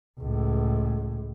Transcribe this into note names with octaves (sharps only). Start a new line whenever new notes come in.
C#2 A2